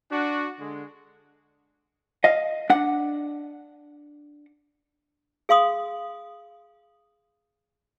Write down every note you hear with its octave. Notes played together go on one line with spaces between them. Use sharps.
D4 F#4
D3 G#3
D#5 F5
D4 F#5
G#4 F5 C6 D#6